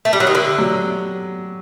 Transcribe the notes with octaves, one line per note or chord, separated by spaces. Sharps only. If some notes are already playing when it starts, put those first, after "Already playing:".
A3
G3
F#3
D#3
D3 G4
F#3